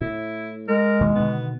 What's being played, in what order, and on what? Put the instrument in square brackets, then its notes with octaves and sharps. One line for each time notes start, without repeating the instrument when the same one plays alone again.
[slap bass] A2 [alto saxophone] E4
[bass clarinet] G#3 [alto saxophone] A#4
[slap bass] D#2 B2 D#3
[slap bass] B2 D3 D#3 [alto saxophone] B3